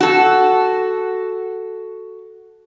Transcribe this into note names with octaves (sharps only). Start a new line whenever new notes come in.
F#4 A4